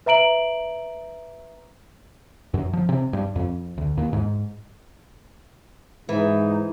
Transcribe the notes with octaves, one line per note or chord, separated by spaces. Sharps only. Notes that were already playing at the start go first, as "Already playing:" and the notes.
B4 E5 A#5 D7 F#7
F#2
F3
C3
G2
F2
D2
D#2
G#2
G#2 E3 D#4